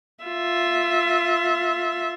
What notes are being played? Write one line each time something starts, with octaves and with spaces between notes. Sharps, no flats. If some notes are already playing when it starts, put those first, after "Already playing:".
F4 E5